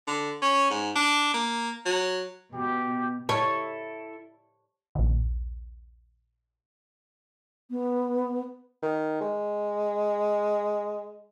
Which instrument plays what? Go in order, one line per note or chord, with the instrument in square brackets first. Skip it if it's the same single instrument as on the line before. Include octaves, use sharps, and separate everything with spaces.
[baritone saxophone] D3
C#4
G#2
D4
A#3
F#3
[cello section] B2 [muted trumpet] G4
[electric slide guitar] E4 A4 [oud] C#5 [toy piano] A5
[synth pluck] A#1 D#2
[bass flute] B3
[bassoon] D#3
G#3